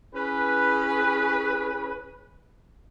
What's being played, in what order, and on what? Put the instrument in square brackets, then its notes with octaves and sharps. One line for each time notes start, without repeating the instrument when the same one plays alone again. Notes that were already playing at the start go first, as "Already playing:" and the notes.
[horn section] C#4 E4 G#4 B4